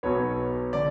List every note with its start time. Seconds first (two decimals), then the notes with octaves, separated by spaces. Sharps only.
0.03 B1 B2 F#3 B3 C#5
0.73 D3 D5